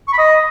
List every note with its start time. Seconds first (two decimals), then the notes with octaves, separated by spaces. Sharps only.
0.08 C#6
0.13 B5
0.18 D#5